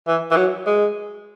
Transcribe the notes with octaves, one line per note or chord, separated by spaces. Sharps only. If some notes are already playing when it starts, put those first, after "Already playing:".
E3
E3
F#3
G#3